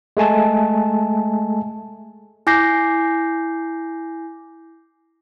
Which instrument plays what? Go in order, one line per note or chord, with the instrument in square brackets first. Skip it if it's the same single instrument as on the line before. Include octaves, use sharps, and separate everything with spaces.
[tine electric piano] G#3 A3 G#5 A5
[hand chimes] E4 G#5 D6 G6 A#6 C7